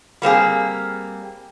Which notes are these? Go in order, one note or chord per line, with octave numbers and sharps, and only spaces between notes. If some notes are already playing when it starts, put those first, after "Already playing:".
G3 A#3 C4 G#4